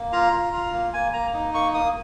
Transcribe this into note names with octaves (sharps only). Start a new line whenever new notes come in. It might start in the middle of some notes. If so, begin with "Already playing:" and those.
Already playing: A#3
F4 A#5
F4
F4
A#3
A#3 G#5
A#3 A#5
D#4
A#3 C#6
A#3 D#6